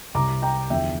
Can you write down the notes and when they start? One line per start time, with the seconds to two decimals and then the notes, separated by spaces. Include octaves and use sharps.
0.15 C2 C3 G3 A#5 D6
0.42 G5 A#5
0.70 E2 D3 F3 E5 G5